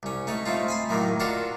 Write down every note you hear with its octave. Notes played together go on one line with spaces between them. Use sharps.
C2 C#4
A3 D#4 C#5
A3 C4 D#4 F4
G#5 B5 C6
F#2 A2 D#3 F#3 A#3
D4 F4 F#4 A4 A#4